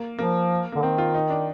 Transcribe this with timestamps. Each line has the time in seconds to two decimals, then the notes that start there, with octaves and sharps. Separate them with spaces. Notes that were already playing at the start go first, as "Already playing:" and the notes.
Already playing: A#3
0.18 F3 A#3
0.72 D3 A#3
0.83 D#3 C4
0.98 F4
1.15 D#4
1.30 D4